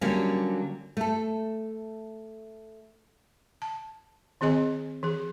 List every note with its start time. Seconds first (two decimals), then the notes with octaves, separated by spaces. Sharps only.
0.01 D3 F#3 G3 A#3 C#4
0.97 A3 A4
3.62 A5
4.41 D#3 C4 G#4 D#5 G#5
5.03 E3 G#4